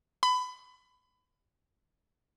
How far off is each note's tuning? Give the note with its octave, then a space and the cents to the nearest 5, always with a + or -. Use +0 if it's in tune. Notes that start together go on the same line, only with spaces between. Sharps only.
B5 +25